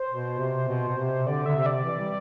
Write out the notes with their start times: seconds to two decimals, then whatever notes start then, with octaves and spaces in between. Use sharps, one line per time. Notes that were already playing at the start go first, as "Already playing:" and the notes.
Already playing: C5
0.11 B2
0.39 C3
0.68 B2
0.89 B2
0.98 C3
1.27 D3 D5
1.46 D3 E5
1.56 C3
1.66 D5
1.84 E3
1.99 G3